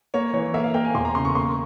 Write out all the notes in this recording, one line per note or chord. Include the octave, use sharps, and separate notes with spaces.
A#3 C#5
E3 C#5
A#3 E5
F5
A#3 G5
G#5
E1 C6
A#5
C#3 C6
C#6
A#3 C6